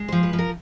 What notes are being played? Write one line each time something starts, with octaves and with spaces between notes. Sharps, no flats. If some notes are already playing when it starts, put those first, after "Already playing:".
Already playing: G#3
F3 C5
B4
F3
A#4